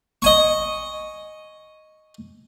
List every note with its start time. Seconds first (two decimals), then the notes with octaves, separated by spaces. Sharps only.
0.22 D#5 G#5 C#6